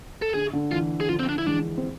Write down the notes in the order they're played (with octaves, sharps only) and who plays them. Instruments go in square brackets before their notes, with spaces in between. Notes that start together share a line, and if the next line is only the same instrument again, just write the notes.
[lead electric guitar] A4
[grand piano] D3 [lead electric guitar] G#4
[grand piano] D3
[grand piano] E3 [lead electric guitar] F4
[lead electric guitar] G#4
[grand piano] D3 F3 [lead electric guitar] F4
[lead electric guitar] C4
D4
E4
[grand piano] E3 G#3 [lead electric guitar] D4
[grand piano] C4